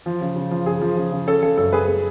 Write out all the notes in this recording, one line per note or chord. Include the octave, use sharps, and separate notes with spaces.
F3
C#3
C#3
F3
C#3 G#4
F3
C#3
C#3
C#4 A4
C#3 A4
F#2 A4
G#3 G#4 B4
G#3